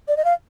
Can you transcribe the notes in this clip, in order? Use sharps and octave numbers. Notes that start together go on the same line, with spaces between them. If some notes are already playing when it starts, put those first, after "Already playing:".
D5
D#5
F5